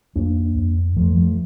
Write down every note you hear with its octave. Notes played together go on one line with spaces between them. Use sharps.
F2 A#3 D4
F2
F2 F3 A3
F3 A3